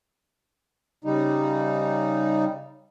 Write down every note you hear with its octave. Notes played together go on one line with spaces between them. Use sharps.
C#3 G3 D#4